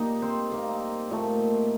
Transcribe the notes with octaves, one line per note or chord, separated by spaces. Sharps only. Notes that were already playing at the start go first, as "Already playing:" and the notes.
Already playing: A#2 G3 A#3 D#4 D#5
C4 C5
A#3 A#4
A#2 A3